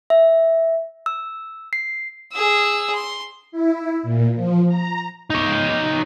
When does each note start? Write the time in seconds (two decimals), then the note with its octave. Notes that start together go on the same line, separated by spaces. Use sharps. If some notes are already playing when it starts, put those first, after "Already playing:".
0.10 E5
1.06 E6
1.73 C7
2.33 G#4 E6
2.95 C6
3.52 E4
4.03 A#2
4.35 F3
4.67 A#5
5.30 D#4 C#5